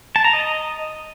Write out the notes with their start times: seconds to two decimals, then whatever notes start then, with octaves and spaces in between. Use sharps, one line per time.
0.16 A5
0.24 A#5
0.33 D#5